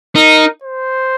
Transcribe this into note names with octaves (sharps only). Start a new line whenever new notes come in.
D#4 A#4
C5